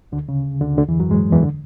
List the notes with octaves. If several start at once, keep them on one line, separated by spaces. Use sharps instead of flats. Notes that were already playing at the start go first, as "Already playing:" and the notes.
D2 D3
C#3
D2 D3
D2 D3
E2 E3
F#2 F#3
G#2 G#3
E2 E3
D3